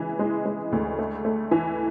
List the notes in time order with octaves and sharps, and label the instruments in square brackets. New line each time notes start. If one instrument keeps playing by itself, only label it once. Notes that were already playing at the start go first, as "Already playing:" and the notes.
Already playing: [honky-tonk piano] C#3 E3 G#3
G#3
G#3
D2
A3
A3
E3